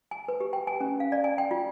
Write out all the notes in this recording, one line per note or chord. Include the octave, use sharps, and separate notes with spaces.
G#5
B4
G4
G5
G#5
C#4
F5
D5
G#5
G5
F4